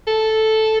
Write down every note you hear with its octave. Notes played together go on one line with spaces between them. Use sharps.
A4